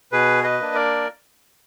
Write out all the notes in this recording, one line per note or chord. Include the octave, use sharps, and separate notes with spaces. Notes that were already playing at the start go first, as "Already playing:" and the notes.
B2 G#4 B4
B4 D#5
A#3 D4
A#4 D5